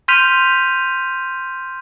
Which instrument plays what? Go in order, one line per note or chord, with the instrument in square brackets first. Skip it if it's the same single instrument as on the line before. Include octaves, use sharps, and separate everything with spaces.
[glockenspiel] C6 F6 G6 B6 D#7 F7